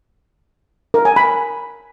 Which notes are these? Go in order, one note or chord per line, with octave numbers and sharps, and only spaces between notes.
A#4
G#5
B5